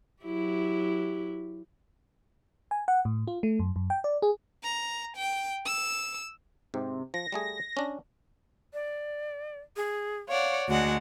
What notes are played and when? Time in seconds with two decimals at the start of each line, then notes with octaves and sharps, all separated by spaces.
0.23 F#3 E4 G4
2.71 G#5
2.88 F#5
3.05 A2
3.27 F4
3.43 A3
3.59 F#2
3.76 F#2
3.90 G5
4.04 D5
4.22 G#4
4.63 A#5
5.16 G5
5.65 E6
6.74 G#2 C3
7.14 F3 A#6
7.32 G3 A3 G#4
7.77 C#4 D4
8.74 D5
9.76 G#4
10.28 C#5 D5 F5 F#5
10.68 D2 G#3 F#4 F#5